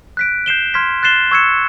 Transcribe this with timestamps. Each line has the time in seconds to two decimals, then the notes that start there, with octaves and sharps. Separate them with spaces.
0.17 F#6 B6 D7
0.46 G6 C7 E7 G7
0.74 C6 F6 G#6 B6
1.03 F#6 A6 C7 E7 G7
1.31 C#6 E6 G#6 C#7 E7